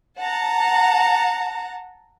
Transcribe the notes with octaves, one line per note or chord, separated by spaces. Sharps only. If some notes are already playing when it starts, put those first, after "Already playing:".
F#5 A5 A#5